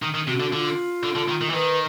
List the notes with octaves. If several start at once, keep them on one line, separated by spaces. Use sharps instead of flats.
D#3
D#3
C3 F#4
D3
D3 F4
D3
D3
D#3
D#3
E3
D#3 B4